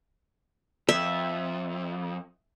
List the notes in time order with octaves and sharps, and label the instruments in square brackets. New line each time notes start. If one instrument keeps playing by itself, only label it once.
[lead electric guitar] F2 [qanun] E5